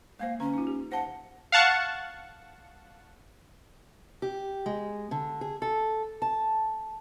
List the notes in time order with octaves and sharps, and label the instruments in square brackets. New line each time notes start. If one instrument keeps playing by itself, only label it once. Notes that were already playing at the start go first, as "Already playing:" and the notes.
[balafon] G#3 A#3 C5 [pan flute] F5
[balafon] D3 A#5 [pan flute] C#4
[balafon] D#4 F4
G4
[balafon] C5 F5 A5 [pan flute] F#5
[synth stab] F5 F#5 A5 C#6
[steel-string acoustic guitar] G4
G#3
D3
G#4
A4
A5